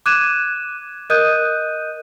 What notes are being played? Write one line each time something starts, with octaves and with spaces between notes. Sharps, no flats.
D6 F#6 G#6 D#7 E7
A#4 D#5 D#6 F#6 G6 D#7